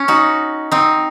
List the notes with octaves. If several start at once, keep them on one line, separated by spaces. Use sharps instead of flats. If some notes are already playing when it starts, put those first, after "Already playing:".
Already playing: C#4
D#4 F#4
C4 D#4